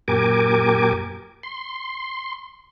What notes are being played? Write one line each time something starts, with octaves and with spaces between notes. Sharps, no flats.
F#2 A#2 G4 A#4 G#5 D6
C6